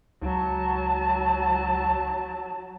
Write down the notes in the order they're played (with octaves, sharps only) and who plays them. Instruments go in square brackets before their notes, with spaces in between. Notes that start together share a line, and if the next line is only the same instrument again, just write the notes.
[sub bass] C#2 [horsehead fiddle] F#3 A5